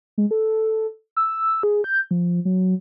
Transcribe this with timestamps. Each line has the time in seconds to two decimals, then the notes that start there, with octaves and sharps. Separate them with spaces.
0.18 G#3
0.31 A4
1.17 E6
1.63 G#4
1.84 G6
2.11 F3
2.45 F#3